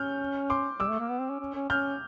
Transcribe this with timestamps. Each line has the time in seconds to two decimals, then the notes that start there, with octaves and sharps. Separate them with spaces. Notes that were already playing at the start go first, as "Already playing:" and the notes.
Already playing: C#4 F6 G6
0.50 C6 D6
0.80 G3 D6 E6
0.90 A3
0.99 A#3
1.10 B3
1.20 C4
1.30 C#4
1.40 C#4
1.55 C#4
1.69 C#4 F6 G6